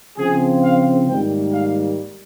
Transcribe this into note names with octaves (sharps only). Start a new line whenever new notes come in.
C#3 F3 C4 F4 G#4
F5
G#2 D#3 G3 A#3 G5
F5